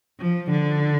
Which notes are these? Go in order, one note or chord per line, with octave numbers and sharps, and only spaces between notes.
F3
D3